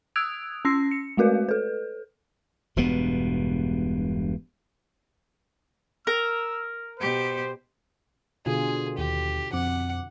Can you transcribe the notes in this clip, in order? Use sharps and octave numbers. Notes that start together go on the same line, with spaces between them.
D#6 E6 F#6 G#6 D7 F7
C#4 C6 E6 A#6 C7
C#7
G#3 A3 F#4 A#4 B4 F5
A4 B4
E1 G2 B2 B3
A#4 E6
B2 G4 C5
B2 D3 F4 G#4 G#5
D#2 G4
F2 C4 F#5 D6